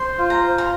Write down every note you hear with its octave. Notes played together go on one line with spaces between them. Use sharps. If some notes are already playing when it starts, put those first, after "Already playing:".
Already playing: C5 C6
F4
A#5
C5
A#5